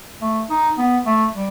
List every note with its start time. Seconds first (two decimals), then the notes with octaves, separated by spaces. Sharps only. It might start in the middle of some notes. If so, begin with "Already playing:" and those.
0.21 A3
0.50 D#4
0.78 B3
1.06 A3
1.35 G3